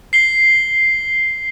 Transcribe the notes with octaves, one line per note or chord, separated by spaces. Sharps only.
C7 G7